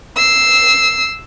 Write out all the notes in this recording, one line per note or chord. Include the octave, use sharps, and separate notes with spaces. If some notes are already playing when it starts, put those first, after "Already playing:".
E6 C7